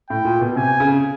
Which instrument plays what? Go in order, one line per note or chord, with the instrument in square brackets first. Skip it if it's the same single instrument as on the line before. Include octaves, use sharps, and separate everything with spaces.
[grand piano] A2 [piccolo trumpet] G5
[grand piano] A#2
B2
[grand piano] C3 [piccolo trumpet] G#5
[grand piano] C#3